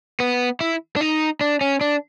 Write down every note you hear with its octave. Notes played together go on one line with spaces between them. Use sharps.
B3
E4
D4
D#4
D4
C#4
D4